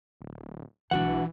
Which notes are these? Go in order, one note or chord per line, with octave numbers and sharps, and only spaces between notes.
D1
B1 E3 G#3 D4 F#4 F#5